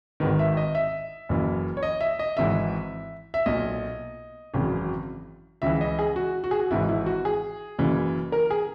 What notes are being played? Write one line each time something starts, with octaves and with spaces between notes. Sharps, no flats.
G#1 G#2 D#3 B4
E5
D#5
E5
F#1 F#2 E3
C#5
D#5
E5
D#5
G#1 G#2 E3 E5
E5
B1 A#2 D#5
G#1 F#2 C#3 E3
C#2 C#3 E3 E5
D#5
G#4
F#4
F#4
G#4
F#4
G#1 G#2 E3 E4
E4
F#4
G#4
F#1 F#2 C#3 E3
A#4
G#4